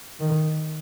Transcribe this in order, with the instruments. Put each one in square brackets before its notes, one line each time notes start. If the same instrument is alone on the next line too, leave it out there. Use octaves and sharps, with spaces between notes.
[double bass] D#3